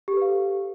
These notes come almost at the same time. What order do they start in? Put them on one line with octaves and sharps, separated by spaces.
G4 A4 B4 F5